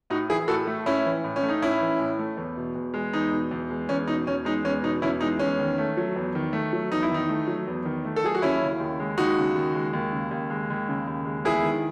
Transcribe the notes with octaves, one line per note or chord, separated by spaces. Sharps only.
A2 D#4 F#4
E3 E4 G#4
A2 F#4 A4
A3
A2 C#4 E4
E3
A2
C#4
A3
D#4
A2 C#4 E4
E3
A2
A3
E2
B2
E2
G#3
E2 D#4
B2
E2
G#3
E2 C#4
B2 D#4
E2 C#4
G#3 D#4
E2 C#4
B2 D#4
E2 C#4 E4
G#3 D#4
E2 C#4
D#3
A3
F#3
E2
D#3
A3
F#3
E2 D#4
E4
D#3 D#4
A3
F#3
E2
D#3
A3
A4
F#3 G#4
F#4
D#2 C#4 E4
C#3
D#2
G#3
D#2 D#4 F#4
C#3
D#2
G#3
D#2
C#3
D#2
G#3
D#2
C#3
D#2
G#3
E2 E4 G#4
D#3